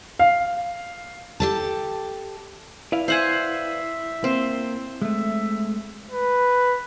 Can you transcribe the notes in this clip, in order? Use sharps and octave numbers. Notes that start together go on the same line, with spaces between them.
F5
G4 A4 A5
E4 B4 D5 F5
C5 E5 F#5 G#5
A#3 C4
G#3 A3 E5
B4